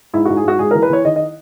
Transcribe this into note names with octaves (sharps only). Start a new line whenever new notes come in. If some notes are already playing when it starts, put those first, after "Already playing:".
G#2 E4
G#2 F#4
G#4
G#2 F#4
G#2 G#4
E3 A#4
B4
E3 C#5
D#3 D#5
D#5